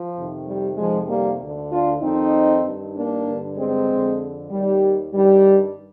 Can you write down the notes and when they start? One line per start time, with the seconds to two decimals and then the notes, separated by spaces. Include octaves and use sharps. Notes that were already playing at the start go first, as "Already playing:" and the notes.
Already playing: F3
0.16 F2 C3 D#3
0.47 G3
0.78 F2 C3 D#3 F3 G#3
1.09 G3 A#3
1.40 D2 D3
1.71 D4 F4
2.02 F2 D#3 C4 D#4
2.65 G2 D#3
2.95 A#3 D4
3.27 G2 D3
3.57 G#3 C4
3.89 F2 D3
4.51 D#2 D#3 G3
5.13 G2 D#3 G3